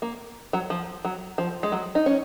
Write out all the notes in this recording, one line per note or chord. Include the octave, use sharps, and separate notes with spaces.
A#3
F#3
F3
F#3
F3
G#3
F#3
D#4
C#4